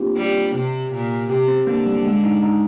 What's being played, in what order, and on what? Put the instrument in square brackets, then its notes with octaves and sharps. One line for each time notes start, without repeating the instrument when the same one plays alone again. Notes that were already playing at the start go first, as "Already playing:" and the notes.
Already playing: [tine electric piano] A#3 C4 D4 F4 G4
[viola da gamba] G3
C3
A#2
[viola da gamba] C3 [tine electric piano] G4
[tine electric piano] C4
[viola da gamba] D3 [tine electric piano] A#3
[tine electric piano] G3
G#3
D#4
D#4